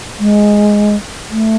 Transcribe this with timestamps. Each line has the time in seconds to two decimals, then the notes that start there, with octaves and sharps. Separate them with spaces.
0.20 G#3
1.30 A3